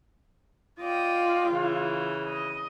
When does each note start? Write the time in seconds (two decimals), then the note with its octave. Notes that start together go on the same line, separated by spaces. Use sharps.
0.80 F4 D5 D#5 G5
1.48 C#3 E3
2.27 D#5